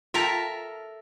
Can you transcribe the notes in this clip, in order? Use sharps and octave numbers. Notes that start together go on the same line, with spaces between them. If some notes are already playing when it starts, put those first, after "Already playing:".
F4 A4 A#4 E5 G5 A#5